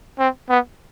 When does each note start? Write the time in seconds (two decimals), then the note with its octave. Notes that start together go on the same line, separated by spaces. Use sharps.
0.19 C4
0.50 B3